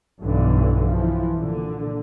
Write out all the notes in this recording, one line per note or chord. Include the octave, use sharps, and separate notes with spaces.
B1 G2 D3 E3
E3 F3
A#2 D3